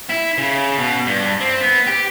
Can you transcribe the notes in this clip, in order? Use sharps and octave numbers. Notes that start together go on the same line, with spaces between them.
E4
C#3
B2
G2
C4
B3
G4